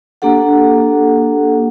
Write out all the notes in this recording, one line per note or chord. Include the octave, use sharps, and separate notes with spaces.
A#3 D4 G4 A4 F#5